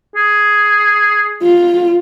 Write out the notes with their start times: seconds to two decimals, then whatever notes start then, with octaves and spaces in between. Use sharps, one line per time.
0.16 G#4
1.43 F4